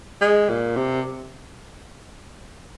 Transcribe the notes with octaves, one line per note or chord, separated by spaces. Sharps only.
G#3
A#2
C3